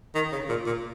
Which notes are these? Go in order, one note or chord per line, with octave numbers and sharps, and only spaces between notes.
D#3
C#3
A#2
A#2